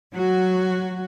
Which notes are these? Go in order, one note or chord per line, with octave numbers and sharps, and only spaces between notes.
F#3 F#4